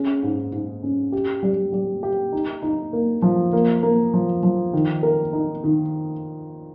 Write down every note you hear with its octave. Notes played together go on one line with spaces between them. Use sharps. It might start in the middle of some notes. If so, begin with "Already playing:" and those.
Already playing: C#4 G#4
G#2
G#2
C#4
G4
G3
G3
G4
D#4
D#4
A#3
F3
A#3
A#3
F3
F3
D#3
A#4
D#4
D#3